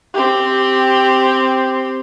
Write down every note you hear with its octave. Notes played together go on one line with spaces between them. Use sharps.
C4 G4